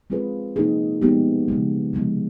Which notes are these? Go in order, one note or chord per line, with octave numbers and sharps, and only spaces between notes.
G#3 C4 F4 G#4 B4
C3 F3 A#3 D#4 G#4
F3 G#3 B3 D#4 G4
C#3 F3 G#3
C3 F3 G#3 B3